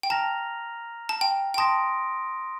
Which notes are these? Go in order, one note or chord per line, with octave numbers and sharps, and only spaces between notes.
G5
A5 A#5 F6 A#6 F7
A5
G5
G5
A5 C6 D#6 A#6 D7